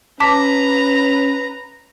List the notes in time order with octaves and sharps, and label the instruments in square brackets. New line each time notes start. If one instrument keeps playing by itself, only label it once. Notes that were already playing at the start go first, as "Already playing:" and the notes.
[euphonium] C#4 [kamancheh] B4 A#5 [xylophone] A5 D6 B6